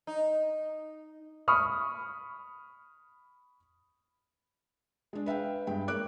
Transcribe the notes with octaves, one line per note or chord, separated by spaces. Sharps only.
D#4
B5 C#6 D#6 F6
G#3 D4
B4 E5 F5 G5
G2 G#3 G5
A#3 C#5 D6 F#6 D7